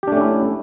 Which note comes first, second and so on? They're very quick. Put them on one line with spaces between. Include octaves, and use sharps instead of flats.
G4 D4 A3 C#4 E4